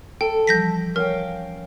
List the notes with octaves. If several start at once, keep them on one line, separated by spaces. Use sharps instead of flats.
A4 G5
E3 F3 G3 G6 A#6 B6
C#4 A#4 F5 G5 F6